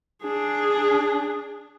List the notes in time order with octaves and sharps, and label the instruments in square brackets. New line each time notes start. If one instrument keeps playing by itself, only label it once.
[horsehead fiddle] D4 G#4